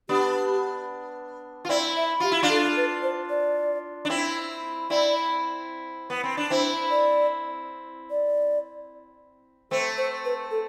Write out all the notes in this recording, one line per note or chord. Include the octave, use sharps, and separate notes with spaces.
B3 D4 G4
F4
C4 E4 D5
E5
F4 G4
E4
D4 F4
A4
B4
C5
D5
D4
C4 E4
C4 E4 D5
B3
C4
D4
C4 E4 C5
D5
D5
A3 C4 C5
C5
B4
A4